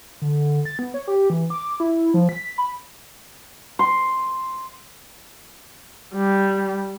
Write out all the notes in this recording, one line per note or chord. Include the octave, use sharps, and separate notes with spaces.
D3
A6
B3
C#5
G4
E3
D6
E4
F3
B6
B5
C6
G3